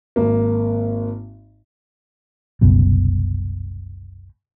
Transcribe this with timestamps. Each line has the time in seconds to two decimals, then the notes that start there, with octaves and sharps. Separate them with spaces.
0.16 G#1 A#3
2.61 F#1 C2 F#2 B2